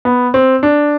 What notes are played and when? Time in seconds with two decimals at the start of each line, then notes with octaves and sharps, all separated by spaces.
0.05 B3
0.34 C4
0.63 D4